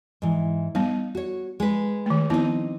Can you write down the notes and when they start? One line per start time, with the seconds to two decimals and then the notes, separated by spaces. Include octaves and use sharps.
0.22 G#2 E3
0.75 G3 B3 D#4
1.15 F#4 C#5
1.60 G#3 B4
2.06 D#3 A3
2.30 F3 B3 C4 D#4 E4